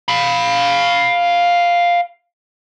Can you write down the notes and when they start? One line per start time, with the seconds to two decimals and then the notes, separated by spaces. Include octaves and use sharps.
0.08 F5 B5